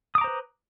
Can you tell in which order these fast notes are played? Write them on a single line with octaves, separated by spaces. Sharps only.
D#6 D6 A#5 C5 B4